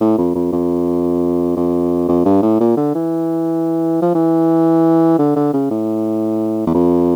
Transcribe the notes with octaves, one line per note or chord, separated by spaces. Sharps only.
A2
F2
F2
F2
F2
F2
G2
A2
A#2
D3
E3
F3
E3
D3
D3
C#3
A2
E2
F2